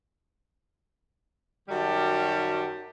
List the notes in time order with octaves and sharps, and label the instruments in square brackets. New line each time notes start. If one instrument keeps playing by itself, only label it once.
[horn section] F#2 D#3 G3 F#4 G4 A5